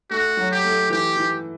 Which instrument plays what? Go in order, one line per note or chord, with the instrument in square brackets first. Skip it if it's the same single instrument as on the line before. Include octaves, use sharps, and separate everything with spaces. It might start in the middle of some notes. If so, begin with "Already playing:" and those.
[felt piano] A3 [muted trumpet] F#4
[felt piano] F#3
[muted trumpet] G4
[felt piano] A3
[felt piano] E3 [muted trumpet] G4
[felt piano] E3